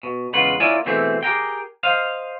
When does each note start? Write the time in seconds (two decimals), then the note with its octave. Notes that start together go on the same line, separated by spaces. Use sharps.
0.03 B2
0.33 E2 C#3 G#3 F4 B4 F#5
0.60 A#3 E4 F4 C#5 D5 G#5
0.86 B2 E3 A3 C4 G#4
1.23 G4 G#4 A#4 G5
1.83 C5 D#5 F5